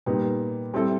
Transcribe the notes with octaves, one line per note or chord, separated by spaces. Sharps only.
A#2 G3 B3 D#4
G3 C4 E4 A4